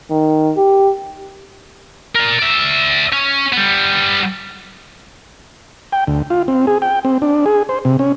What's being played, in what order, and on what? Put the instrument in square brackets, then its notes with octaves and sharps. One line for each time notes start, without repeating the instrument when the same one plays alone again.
[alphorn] D#3
G4
[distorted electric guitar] A#4 D5
D5 E5
C#4
G3 B3
[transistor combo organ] G5
D2
F4
C4
G#4
G5
C4
D4
G#4
C5
C3
C#4